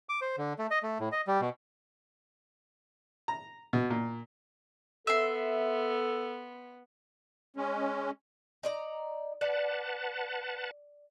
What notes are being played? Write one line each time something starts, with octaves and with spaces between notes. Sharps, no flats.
D6
C5
D3
A3
D#5
A3
A2
D#5
G3
B2
A#5
B2
A#2
B3 A4 E5 C6
G#3 C#4
D#4 D5 A#5
B4 D5 F#5 A5